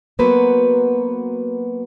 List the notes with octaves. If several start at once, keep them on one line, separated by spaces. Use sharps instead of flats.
F#3 A#3 B3 F#4 B4 C5